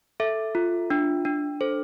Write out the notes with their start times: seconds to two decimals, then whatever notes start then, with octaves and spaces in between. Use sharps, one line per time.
0.20 A4 E5
0.55 F4
0.90 D4
1.25 D4
1.61 A4 C5